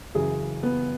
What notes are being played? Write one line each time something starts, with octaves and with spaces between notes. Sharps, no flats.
F#2 C#3 E3 G#4
B3